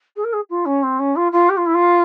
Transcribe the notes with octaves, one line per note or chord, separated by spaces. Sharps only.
G#4
A#4
G#4
F4
C#4
C4
C#4
F4
F4
G4
F4
E4
F4